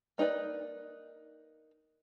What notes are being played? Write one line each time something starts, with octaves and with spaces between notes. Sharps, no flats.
A#3 D#4 A#4 B4 D5